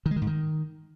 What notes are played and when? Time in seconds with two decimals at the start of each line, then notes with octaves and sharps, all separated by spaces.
0.06 D#3
0.11 G#3
0.16 D#3
0.22 G#2
0.27 D#3